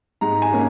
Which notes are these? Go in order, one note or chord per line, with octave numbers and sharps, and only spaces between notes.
G#2 A#5
G#5
A#3 C#4